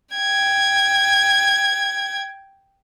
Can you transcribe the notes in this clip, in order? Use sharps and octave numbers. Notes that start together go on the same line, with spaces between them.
G5 G#6